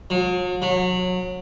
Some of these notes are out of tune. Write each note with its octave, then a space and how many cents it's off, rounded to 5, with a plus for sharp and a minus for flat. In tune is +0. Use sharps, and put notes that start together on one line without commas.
F#3 -45
F#3 -25